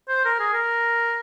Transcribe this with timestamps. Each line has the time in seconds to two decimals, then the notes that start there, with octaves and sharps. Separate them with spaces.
0.08 C5
0.25 A#4
0.39 G#4
0.53 A#4